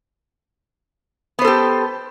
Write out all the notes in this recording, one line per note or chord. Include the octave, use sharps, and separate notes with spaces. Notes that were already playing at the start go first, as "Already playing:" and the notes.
B3 G4 A4 C5